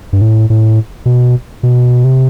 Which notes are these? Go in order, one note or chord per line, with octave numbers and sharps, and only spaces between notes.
G2
A2
A2
B2
B2
C3